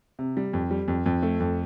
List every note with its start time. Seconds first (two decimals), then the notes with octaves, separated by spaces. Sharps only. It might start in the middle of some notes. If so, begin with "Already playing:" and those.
0.19 C3
0.37 G3
0.53 F2
0.71 G3
0.88 F2
1.06 F2
1.23 A3
1.40 F2